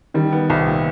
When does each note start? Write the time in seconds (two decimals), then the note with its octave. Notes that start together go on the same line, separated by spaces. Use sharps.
0.14 D#3 G3
0.32 B3
0.50 C2
0.67 A#2